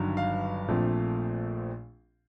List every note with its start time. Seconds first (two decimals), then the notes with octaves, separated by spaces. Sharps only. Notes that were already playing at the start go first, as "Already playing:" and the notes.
Already playing: G1 G2 D#3 F#3
0.17 F5
0.68 A#1 A#2 F3 A3 C4